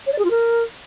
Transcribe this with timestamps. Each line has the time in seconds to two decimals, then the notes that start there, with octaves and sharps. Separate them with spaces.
0.06 C#5
0.12 D5
0.18 G#4
0.24 F4
0.30 A#4